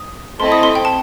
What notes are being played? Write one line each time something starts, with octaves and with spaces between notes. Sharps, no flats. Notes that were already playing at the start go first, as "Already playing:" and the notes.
Already playing: D#6
A3 C4 E4 A4 D#5 C6
D#6
C6
G5
A5